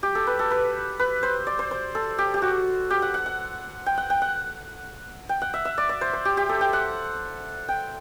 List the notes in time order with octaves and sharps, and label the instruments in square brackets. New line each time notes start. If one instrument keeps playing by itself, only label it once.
[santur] G4
A4
B4
A4
B4
B4
C5
D5
C5
C5
A4
G4
G4
F#4
G4
F#5
F#5
F#5
G5
F#5
G5
F#5
G5
F#5
E5
E5
D5
D5
C5
C5
G4
G4
A4
G5
F#5
G5